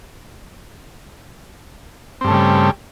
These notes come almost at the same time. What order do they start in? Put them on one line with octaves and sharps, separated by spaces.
C4 G2 A3 C#3 G3